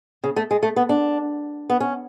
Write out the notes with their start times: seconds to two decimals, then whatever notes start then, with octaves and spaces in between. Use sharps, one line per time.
0.24 C#3
0.36 A3
0.51 G#3
0.63 A3
0.76 B3
0.89 D4
1.69 B3
1.80 C#4